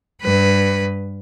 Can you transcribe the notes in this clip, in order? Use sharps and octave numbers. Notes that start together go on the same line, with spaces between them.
G2 B4